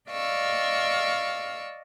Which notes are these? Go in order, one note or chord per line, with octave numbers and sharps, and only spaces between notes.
D5 D#5 F5 C#6 E6